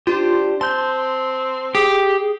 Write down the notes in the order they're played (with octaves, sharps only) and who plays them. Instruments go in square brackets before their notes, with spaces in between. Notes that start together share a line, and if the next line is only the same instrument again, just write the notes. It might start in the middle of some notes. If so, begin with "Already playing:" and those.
[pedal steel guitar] D4 G4 [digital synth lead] F4 [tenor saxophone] C5
[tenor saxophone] C4 [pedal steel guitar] A5 G6 [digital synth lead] C6
[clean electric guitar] G4 [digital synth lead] G#4